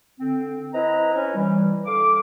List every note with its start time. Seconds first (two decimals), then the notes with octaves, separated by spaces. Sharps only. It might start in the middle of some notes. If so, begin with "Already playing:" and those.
0.20 D3 C4
0.74 C4 E4 B4 D#5 A#5
1.14 C#4 E4
1.35 E3 G3
1.85 D3 F5 D6